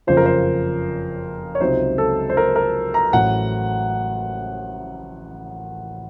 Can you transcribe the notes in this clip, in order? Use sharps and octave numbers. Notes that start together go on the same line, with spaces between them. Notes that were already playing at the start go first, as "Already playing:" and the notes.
F#1 F2 C#3 F3 C5
A#4
C5
C#5
C#2 C3 F#3 C4 D#4 C5
A4
C5
A#4
A#4
A#5
A1 A2 F#3 F#5